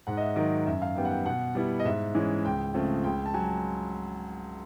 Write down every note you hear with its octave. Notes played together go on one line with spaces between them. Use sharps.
G#2 F#5
D#5
E5
D#3 F#3 D#5
F#2 E5
F5
D#3 G3 B3 G5
F#5
G5
B2 F#5
G3 B3 E4
D#5
G#2 E5
E3 G#3 C#4
C#2 G5
C#3 F3 A3 C4
C#2 G5
A5
F#3 G#5